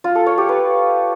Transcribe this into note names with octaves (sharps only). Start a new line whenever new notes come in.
F4
A4
C#5
G4
B4